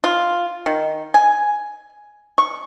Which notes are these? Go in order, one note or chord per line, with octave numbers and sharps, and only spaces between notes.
F4
D#3
G#5
C#6